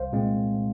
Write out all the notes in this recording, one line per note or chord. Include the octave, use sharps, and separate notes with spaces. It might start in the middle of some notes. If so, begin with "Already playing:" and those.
Already playing: C2 C5 F5
A#2 G#3 C4